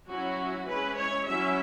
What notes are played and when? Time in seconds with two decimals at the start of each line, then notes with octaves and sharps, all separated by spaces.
0.09 F#3 C#4 E4 F#4
0.68 G#3 C#4 E4 B4
0.96 C#5
1.27 F#3 C#4 E4 E5